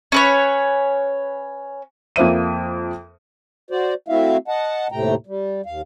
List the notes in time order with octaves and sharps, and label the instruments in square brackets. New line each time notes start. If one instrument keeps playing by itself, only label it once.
[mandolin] C#4 B4 C#5
[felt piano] F2 A#3 C5 E5 D#7
[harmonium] F#4 C5 D5
A3 C4 E4 F#4 E5 F5
D#5 F#5 A5
D#2 A2 C3 A3 G5 A#5
G3
D#2 F5